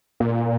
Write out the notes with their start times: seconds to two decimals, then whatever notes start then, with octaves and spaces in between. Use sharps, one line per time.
0.20 A#2